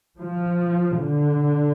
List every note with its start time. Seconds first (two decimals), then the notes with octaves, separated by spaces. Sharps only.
0.19 F3
1.02 D3